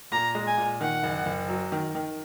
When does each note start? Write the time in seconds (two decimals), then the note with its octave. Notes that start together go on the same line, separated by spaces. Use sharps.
0.12 A#2 A#5
0.35 G#3
0.47 G#5
0.58 A#2
0.81 D#3 F#5
1.03 F#1
1.26 F#1
1.49 F#3
1.72 D#3
1.95 D#3